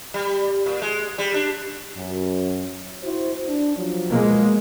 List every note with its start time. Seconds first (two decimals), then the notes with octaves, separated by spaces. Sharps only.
0.14 G3
0.66 A#2
0.82 G#3
1.18 G3
1.34 D4
1.95 F#2
3.03 E4 F#4 C5
3.47 D4
3.77 F3 F#3
4.11 B2 G#3 A#3